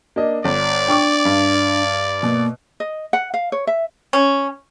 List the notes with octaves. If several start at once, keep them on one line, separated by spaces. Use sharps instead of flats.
A#3 D4 D#5
G1 D5
D4 G5 C#6 D6
G2
B2 A#3
D#5
F#5
F5
C#5
E5
C#4